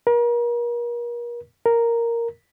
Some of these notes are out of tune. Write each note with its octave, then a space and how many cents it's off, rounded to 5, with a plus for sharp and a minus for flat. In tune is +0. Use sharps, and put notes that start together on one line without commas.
A#4 +35
A#4 -5